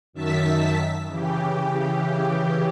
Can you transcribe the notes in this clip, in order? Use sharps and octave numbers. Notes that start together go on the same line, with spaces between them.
F#2 D#3 E5 A5 B6
C#3 E3 G4